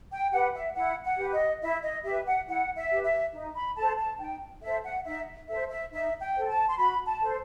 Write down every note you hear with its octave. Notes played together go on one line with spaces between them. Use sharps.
G5
G4 B4 F#5
E5
E4 F#5
F#5
G4 B4
D#5
E4 E5
D#5
G4 E5
B4
F#5
E4 F#5
E5
G4 B4
E5
D#4
B5
A4 C5 A5
A5
D#4 G5
A4 C5 E5
F#5
D#4 E5
A4 C5 E5
E5
D#4 E5
G5
A4 C5
A5
C6
F#4 B5
A5
A4 C5